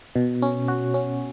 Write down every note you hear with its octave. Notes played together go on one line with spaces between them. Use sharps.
B2
C#4
F#4
C#4